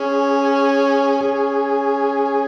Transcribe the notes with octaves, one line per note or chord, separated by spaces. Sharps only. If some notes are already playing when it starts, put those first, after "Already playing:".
Already playing: C#4 G#4
C#4 G#4